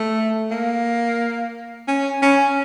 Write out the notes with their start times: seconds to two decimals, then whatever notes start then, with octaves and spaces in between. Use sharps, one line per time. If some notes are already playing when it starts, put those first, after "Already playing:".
Already playing: A3
0.51 A#3
1.88 C#4
2.22 C#4